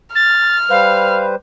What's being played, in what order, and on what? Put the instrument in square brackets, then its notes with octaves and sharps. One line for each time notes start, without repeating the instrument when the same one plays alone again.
[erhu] F6 [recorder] A6
[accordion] G3 B4 C5 [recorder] F5